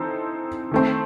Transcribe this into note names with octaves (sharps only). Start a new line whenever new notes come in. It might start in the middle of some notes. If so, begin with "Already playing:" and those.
Already playing: E3 C4 D#4 A4
D#3 A3 C4